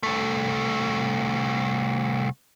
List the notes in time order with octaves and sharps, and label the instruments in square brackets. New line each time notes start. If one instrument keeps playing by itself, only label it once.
[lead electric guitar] C2 A3